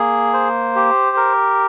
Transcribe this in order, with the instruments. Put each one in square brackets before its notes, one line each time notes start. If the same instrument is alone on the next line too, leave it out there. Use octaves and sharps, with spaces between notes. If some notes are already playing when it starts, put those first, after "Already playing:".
Already playing: [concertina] A#3 G#4
C5
G4
A#4